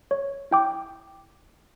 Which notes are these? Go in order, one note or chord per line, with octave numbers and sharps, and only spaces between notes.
C#5
E4 G5 D6